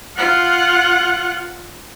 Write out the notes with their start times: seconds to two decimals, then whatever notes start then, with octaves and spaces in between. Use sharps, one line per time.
0.17 F4 F#5